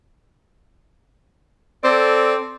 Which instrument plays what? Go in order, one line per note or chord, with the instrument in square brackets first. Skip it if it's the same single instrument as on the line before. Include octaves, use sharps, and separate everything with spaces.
[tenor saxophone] C4 [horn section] A4 D5